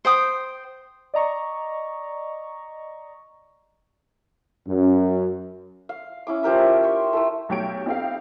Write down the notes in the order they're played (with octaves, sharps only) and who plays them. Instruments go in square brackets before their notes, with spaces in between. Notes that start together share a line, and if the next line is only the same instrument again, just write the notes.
[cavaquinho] C5 G5 D#6
[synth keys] D5 D#5 A#5 C#6
[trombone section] F#2
[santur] F5
C#4 E4 D6
F3 G4 A#4 E5
E5
C6 C#6
A3 E4 A4
[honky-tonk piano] B1 F#3 A3 G4 C#5 D7
C4 D#4 E4 G4 A4 F5